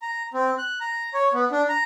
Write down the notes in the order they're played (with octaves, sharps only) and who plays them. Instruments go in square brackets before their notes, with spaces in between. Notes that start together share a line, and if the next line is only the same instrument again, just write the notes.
[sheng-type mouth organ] A#5
C4
F#6
A#5
C#5
B3
D4
A#5